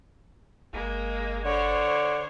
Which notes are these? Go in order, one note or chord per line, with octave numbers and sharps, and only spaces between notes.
G1 G#3 A#3
D3 C5 C#5